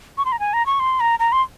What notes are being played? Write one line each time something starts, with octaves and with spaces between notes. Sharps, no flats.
C#6
C6
A#5
G#5
A#5
C#6
C6
A#5
A#5
C6